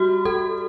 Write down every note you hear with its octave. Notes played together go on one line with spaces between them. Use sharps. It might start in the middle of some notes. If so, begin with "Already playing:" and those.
Already playing: G3 F#4
A4